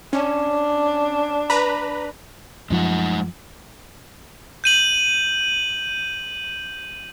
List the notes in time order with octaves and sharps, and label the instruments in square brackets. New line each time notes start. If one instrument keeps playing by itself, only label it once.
[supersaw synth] C#4 [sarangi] D4
[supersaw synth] B4 A#5 B5
[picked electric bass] F#2 F3 [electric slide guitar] G#3 D#4 F#5
[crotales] G6 D#7 F#7